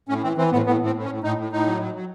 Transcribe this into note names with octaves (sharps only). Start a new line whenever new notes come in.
A2 C#4
E3 C4
E3 C4
A2 B3
A2 B3
A2 C4
A2
C#4
A2
A2 D#4
A2
A2 D#4
F#3
F#3
F#3